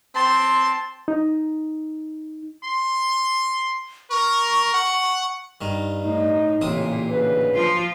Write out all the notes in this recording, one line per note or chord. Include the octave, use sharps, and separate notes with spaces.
C4 A5 C6
D#4
C6
A#4 C#6
F#5
G2 D#3
A2 D#4
A1 D#2 A#2 C#3 C4 D#6
D2 C#3 B4
F3 F4